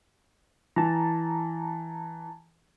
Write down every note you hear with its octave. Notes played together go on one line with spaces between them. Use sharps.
E3 A5 A#5